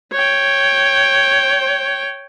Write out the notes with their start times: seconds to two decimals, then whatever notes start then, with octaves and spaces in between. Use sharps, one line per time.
0.12 C#5 G5